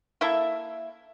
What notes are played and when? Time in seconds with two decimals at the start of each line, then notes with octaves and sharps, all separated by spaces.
0.21 A#3 E4 A4 E5